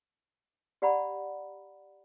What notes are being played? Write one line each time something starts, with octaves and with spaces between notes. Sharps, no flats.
G4 D5 F#5 A#5 B5